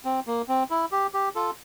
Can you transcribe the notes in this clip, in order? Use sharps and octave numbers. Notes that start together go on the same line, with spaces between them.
C4
A#3
C4
E4
G4
G4
F4 A4